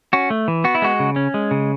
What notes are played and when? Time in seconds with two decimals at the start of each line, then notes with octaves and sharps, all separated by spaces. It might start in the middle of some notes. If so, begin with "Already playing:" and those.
0.13 C#4 F#4
0.30 A3
0.48 E3
0.64 B3 F#4
0.75 E4
0.82 G#3 F#4
1.00 C#3
1.16 C#4
1.34 G#3
1.51 C#3